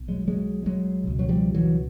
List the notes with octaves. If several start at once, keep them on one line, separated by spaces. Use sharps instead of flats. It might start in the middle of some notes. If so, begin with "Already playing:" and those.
Already playing: B1
F#3 G#3
F#3 G#3
F#3 G#3
C#2 B2
F#3
F3 G3
E3 F#3